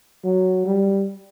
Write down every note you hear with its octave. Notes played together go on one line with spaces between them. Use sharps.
F#3
G3